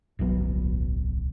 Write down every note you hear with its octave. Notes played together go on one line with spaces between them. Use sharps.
D1 B1 F#3 B3